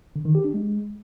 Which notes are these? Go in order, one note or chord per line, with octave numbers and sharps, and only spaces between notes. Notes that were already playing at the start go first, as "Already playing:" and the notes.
D3
D#3
G4
D4
G#3